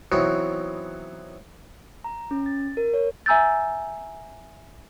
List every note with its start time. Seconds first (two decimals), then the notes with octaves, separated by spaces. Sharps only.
0.12 E3 F#3 B3 C4 D#4 F#4
2.04 A#5
2.31 C#4
2.46 A6
2.77 A#4
2.94 C#5
3.26 E5 G#5 A#5 E6 G6 A6